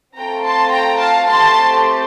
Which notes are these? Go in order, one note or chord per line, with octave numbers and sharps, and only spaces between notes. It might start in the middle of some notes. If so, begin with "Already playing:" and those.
A3 C4 F4 A4 G5 A#5
A5 C6
G5 A#5
F5 A5
A3 C4 G4 A5 C6